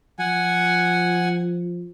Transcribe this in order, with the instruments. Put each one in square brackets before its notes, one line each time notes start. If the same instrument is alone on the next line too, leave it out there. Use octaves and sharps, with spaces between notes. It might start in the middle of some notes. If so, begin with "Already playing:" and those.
[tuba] F3 [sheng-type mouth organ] F#5 G#5